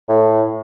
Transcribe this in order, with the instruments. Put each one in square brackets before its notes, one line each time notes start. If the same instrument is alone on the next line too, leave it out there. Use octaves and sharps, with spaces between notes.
[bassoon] A2